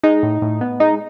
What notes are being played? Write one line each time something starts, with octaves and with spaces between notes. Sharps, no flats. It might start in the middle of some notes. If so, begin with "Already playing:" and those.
G#3 D#4
A2
A2
B3
G#3 D#4